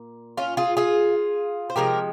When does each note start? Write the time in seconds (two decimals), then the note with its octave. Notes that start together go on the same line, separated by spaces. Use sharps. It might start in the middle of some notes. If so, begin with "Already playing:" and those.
Already playing: A#2
0.37 C#4 F4
0.57 F4 G#4
0.77 F4 G#4
1.70 C5
1.76 C3 F3 G#3 G4 A#4